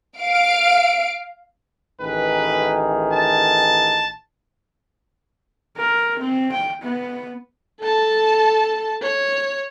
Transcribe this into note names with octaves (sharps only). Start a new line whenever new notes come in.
F5 D7
A1 D#3 G#4 B4
A5
A#4
C4
G5
B3
A4 A5
C#5